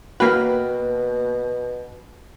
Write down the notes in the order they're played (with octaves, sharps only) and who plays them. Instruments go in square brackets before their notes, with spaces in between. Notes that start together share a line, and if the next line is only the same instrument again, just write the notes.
[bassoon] B2 [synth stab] A#3 B4 [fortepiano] F#4 G5 F6